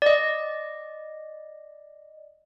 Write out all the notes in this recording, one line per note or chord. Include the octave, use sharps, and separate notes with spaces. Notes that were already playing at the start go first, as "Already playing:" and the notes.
D5 D#5